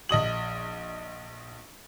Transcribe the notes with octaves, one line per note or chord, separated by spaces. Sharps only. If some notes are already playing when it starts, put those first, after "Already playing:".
A#1 D#5 D#6 F#7